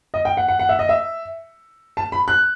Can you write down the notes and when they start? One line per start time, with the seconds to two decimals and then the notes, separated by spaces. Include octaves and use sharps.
0.14 D#5
0.25 G5
0.37 F#5
0.48 F#5
0.59 F#5
0.69 E5
0.79 D#5
0.89 E5
1.97 A5
2.12 B5
2.28 F#6